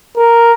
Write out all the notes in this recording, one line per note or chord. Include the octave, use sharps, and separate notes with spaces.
A#4